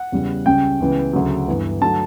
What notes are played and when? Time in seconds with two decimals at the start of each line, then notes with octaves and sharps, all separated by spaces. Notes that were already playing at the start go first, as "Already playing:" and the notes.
Already playing: F#5
0.12 E2 C#3 G3
0.46 C#2 C#3 G3 C#4 G5
0.81 C#2 C#3 E3 B3
1.13 D2 C#3 F#3
1.48 G2 E3 B3
1.82 D3 F#3 A3 A5